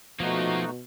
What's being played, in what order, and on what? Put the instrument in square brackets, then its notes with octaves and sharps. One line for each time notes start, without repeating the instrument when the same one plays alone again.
[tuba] B2 [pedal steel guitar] F3 [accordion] A3 D#4 F#4 [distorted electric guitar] A#3 F4